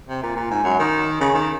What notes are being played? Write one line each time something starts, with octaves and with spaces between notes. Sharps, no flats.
C3
A#2
A#2
G#2
F#2
D#3
C#3
D#3